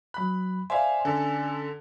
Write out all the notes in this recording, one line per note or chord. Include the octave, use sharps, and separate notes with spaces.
F#3 B5 F#6
C5 D5 E5 F5 G#5 C6
D3 C#4 A4